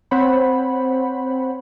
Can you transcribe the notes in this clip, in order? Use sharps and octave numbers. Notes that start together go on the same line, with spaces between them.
C4 C5 C#5 F#5 B5